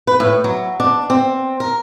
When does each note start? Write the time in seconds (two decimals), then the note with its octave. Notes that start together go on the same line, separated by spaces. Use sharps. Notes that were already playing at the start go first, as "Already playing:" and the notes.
0.07 B4
0.20 A2
0.44 F#3
0.80 D4
1.10 C4
1.60 A#4